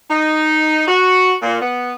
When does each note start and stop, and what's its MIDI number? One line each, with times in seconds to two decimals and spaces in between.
0.09 0.83 63
0.87 1.34 66
1.42 1.58 46
1.60 1.94 59